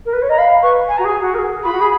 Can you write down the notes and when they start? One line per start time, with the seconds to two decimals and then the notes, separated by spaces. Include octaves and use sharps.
0.06 A#4
0.13 B4
0.22 C#5
0.29 D#5 A#5
0.38 F5 B5
0.62 B4 C#6
0.88 G#5
0.98 F#4 A#5
1.05 G#4 G#5
1.21 F#4
1.34 A#4
1.39 G#4
1.64 F4 B5
1.72 F#4
1.81 G#4